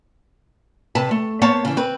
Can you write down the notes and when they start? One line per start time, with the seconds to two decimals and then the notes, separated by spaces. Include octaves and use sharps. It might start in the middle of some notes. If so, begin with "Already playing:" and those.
0.95 C3 B4 A5
1.11 A3
1.41 A#3 B3 C5 C#5 A5
1.65 C#3 E3
1.77 C4 B4